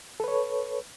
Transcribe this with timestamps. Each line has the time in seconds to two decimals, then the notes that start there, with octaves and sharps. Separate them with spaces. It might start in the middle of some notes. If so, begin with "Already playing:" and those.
0.20 A4
0.24 B4
0.28 C#5